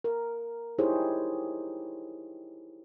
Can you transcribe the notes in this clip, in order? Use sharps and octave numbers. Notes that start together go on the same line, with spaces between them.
A#4
D#4 E4 G4 G#4 C5 C#5